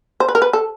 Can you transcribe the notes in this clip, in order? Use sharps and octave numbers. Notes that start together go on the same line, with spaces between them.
C5
B4
A#4
B4
A4